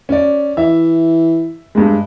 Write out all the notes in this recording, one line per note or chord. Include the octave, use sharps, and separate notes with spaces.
C#4 D5
E3 E5
G2 G#3